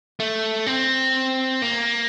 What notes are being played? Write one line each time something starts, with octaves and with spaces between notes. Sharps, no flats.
A3
C4
A#3